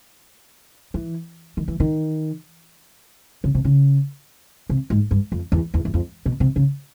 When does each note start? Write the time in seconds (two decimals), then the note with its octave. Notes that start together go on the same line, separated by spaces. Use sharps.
0.94 E3
1.57 D#3
1.68 E3
1.80 D#3
3.44 C#3
3.55 C3
3.65 C#3
4.70 C3
4.90 G#2
5.11 G2
5.32 F2
5.52 E2
5.74 E2
5.85 E2
5.94 F2
6.26 B2
6.40 C3
6.56 C#3